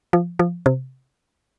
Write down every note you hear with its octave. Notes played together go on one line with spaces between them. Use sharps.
F3
F3
C3